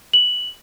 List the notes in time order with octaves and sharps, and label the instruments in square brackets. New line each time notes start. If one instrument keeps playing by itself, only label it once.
[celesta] F#7